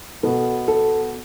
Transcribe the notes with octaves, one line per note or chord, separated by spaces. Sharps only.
B2 B3 A4
A4